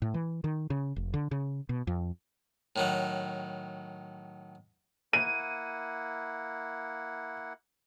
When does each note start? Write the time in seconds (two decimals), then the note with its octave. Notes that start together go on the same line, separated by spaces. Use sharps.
0.02 A2
0.14 E3
0.44 D#3
0.70 C#3
0.96 F1
1.14 D3
1.31 C#3
1.69 B2
1.87 F2
2.76 A2 D#3 F#3
5.13 A#3 E4 F#5 D#7